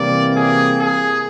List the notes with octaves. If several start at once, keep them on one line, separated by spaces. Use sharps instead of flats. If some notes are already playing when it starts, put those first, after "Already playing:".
Already playing: C3 E3 G3 A#3 D5
G#4
G#4